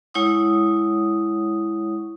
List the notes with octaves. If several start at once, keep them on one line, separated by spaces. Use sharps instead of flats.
G#3 E4 C#5 F#5 C#6 D#6